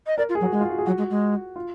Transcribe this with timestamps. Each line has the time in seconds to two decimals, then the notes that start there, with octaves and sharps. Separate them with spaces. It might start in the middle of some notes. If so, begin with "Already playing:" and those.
0.07 D#5
0.18 A#4 D5
0.29 F4
0.35 G#4
0.41 F#3 F#4
0.52 G#3 F#4
0.60 F4
0.69 F#4
0.78 G#4
0.86 F#3 F#4
0.98 G#3
1.10 G#3
1.56 F4